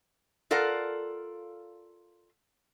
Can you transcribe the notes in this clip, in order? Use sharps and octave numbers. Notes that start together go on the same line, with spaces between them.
F4 A4 A#4 D5 F5 F#5